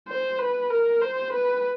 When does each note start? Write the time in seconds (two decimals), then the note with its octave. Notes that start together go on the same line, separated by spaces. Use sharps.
0.09 C5
0.39 B4
0.70 A#4
1.02 C5
1.33 B4